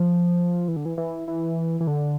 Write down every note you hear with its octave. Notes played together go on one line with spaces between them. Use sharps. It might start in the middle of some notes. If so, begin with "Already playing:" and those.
Already playing: F3
E3
D3
E3
E3
E3
E3
D3